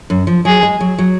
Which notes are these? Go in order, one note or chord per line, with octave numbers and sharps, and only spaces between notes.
F#2
F3
F#3 G#4
G#3
F#3
F#3